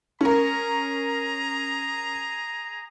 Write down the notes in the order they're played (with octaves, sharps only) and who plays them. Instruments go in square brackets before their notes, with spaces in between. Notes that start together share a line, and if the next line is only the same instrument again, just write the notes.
[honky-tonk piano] C#4 A#4 [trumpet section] G#4 A#5